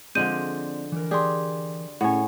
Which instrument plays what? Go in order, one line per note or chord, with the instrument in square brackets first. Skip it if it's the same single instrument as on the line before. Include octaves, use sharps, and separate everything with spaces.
[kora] D3 F3 G#3 [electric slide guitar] C4 D5 [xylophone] G6 D#7
[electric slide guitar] E3 A#4
[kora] G4 G#4 [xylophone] D5 C6
[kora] A2 C#5 [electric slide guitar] C#4 G#4 [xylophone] F#5 G#5